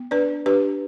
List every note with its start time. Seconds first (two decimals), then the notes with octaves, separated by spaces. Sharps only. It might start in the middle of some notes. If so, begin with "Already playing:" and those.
Already playing: B3
0.11 D4 B4 D5
0.46 D4 G4 B4